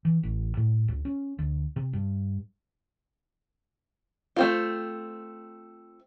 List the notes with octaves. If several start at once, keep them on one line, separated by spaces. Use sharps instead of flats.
E3
A1
A2
C#2
C#4
D2
C3
G2
A3 C4 F4